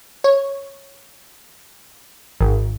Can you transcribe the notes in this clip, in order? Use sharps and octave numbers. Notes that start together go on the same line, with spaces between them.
C#5
G#1